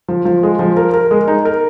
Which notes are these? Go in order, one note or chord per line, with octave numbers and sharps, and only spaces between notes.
F3
F3
G#3
F3
A#4
A#4
G#3
D#4
A#4